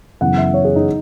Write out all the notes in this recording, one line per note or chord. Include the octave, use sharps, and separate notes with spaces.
F#2 C#3 E3 B3 F#5
E5
C#5
G#4
D#4